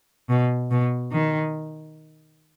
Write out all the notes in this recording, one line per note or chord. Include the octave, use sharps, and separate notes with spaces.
B2
B2
D#3